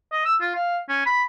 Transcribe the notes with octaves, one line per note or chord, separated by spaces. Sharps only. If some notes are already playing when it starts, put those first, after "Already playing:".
D#5
E6
F4
F5
C#4
B5